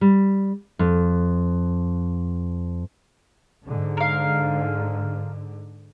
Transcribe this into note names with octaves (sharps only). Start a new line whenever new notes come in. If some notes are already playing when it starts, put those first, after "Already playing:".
G3
F2
G#2 D3
A#4 F5